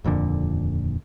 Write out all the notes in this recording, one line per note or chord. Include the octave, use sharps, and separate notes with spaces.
D#1 F2 A#2 D3